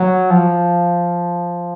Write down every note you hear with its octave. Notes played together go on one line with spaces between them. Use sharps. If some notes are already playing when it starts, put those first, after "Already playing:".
Already playing: F#3
F3